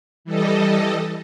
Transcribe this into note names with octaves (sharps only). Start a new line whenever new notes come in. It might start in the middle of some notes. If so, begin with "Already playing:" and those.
E3 G3 A4 D#5